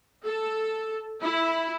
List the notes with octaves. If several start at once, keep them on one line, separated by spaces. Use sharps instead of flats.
A4
E4